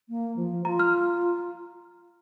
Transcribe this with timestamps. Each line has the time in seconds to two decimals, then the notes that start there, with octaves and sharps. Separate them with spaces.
0.09 A#3
0.36 F3
0.65 F4 A#5
0.79 F6